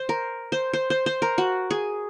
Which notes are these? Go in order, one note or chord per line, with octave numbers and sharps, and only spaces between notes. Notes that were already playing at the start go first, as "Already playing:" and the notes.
Already playing: C5
A#4
C5
C5
C5
C5
A#4
F#4
G#4